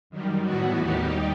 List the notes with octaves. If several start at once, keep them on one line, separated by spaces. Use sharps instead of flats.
F#2 D#3 G3
A2 E3 B3 F#4
D#2 D#3 G3 D#4 G4